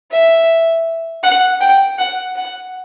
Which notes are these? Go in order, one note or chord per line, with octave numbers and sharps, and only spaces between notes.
E5
F#5
G5
F#5
F#5